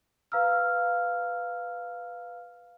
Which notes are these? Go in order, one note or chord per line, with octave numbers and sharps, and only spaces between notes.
B4 F5 A#5 E6 F6